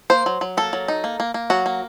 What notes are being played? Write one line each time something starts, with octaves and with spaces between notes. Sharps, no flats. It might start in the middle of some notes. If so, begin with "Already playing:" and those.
A#3 C5
F#3
F#3
A#3 A4
F#3
D#4
A#3
A#3
A#3
F#3 F#4
A#3